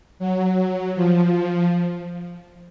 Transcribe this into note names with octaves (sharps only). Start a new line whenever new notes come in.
F#3
F3